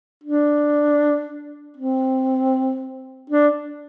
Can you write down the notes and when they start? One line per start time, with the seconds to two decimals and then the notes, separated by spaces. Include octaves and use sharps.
0.24 D4
1.77 C4
3.30 D4